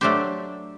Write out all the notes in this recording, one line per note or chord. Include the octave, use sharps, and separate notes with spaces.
F#3 A3 D4 G4 C5